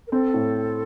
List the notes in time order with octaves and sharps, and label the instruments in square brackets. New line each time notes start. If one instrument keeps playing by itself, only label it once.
[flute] A#4
[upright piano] C4 [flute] A4
[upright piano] A2